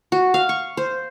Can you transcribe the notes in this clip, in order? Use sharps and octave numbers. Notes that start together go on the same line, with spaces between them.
F#4
F5
C#6
C5